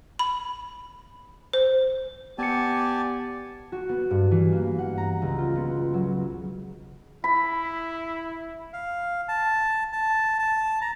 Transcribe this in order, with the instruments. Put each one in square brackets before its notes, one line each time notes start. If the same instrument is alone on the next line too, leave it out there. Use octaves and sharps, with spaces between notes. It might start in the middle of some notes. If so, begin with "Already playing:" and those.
[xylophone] B5
C5
[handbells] B3 C#7 [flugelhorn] G4 [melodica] D5 G#5 A5
[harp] F#4
B3
G2
E3
A#3
F#5
A#5
C#2
F4
B3
F#3
[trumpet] E4 [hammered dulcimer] B5
[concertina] F5
A5
A5
A5
A#5